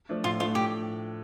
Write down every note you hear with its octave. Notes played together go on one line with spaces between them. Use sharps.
F3 A3 D4
A2 F4
F3 A3 D4 F4
A2 G4